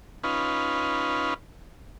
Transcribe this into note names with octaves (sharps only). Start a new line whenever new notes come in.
C#4 D#4 F4 B4